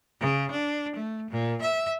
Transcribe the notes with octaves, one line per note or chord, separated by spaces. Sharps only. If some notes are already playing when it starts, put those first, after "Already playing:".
C#3
D4
A3
A#2
E5